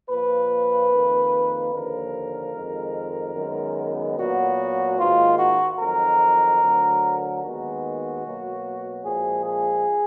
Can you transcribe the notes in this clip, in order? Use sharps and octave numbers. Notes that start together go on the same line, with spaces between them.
A#2 F3 A#3 B4
F2 D#3 A#3
D#2 D3 F3 A#4
F2 D#3 G#3
F#2 D#3 G#3 B3
A#2 F#3 B3 F#4
G#2 D#3 A#3 F4
F#4
F2 D#3 F#3 A#4
D2 D3 F#3
D#2 D#3 G#3 B3 F#4
B2 F#3 A#3
A#2 F3 G#3 G#4
G#4